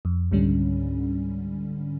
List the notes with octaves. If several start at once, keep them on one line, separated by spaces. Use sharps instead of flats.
F2
C#2 G#2 D3 G3 C#4